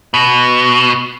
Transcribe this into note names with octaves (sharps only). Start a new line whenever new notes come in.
B2